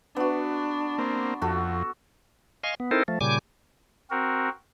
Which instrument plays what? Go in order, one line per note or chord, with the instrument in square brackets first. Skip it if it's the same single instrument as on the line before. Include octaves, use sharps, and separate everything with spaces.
[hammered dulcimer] B3 F#4 [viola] D4
[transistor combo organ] A#3 C4
[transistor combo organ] F2 [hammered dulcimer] F#4 A4
[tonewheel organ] D#5 F5 G#5 C6 C#6
B3
C4 D#4 E4 A4 A#4 C5
F3 A3
A#2 C#3 G3 G#5 D6
[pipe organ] C4 F#4 A#4